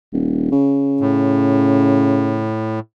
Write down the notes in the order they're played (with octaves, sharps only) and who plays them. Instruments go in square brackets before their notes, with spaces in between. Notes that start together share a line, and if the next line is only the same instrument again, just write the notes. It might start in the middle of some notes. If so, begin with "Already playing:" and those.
[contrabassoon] D#1
C#3
[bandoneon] A2